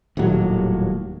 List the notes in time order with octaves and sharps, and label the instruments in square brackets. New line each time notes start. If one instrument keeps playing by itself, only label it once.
[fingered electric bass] D#1 D#2 A2 F#3